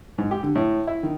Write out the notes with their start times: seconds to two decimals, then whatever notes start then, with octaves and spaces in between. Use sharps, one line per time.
0.18 G#2
0.31 G4
0.43 D3
0.55 A2
0.87 E4
1.03 D#3